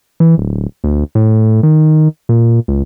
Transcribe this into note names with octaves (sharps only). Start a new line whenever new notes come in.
E3
D1
D2
A2
D#3
A#2
C#2